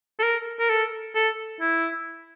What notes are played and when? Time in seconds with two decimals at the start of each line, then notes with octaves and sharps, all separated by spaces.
0.19 A4
0.23 A#4
0.60 A#4
0.70 A4
1.15 A4
1.61 E4